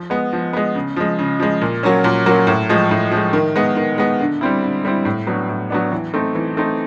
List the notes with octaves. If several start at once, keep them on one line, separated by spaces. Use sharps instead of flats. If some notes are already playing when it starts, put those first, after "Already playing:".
Already playing: F3
G#3 B3
F3
G#3 B3
C#3
F3 G#3
C#3
F3 G#3
A#2
F#3 A#3 C#4
A#2
F#3 A#3 C#4
A2
F3 G#3
A2
F3 G#3
D#3
G#3 B3
D#3
G#3 B3
D3
G3 C4 E4
D3
G3 C4 E4
A2
F#3 B3 D4
A2
F#3 B3 D4
E3
A3 C4 D#4
E3
A3 C4 D#4